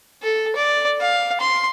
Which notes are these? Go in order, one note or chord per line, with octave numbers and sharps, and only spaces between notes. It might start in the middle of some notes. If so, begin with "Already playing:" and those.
A4
D5
F5
C6